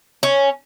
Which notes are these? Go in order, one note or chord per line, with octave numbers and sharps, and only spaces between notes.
C#4